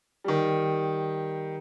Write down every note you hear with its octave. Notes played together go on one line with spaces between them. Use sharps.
D#3 G3